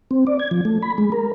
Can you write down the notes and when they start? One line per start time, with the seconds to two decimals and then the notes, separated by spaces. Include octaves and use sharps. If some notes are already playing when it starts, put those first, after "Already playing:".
0.11 C4
0.27 D5
0.39 G#6
0.51 F3
0.65 A3
0.82 B5
0.98 G#3
1.12 A#4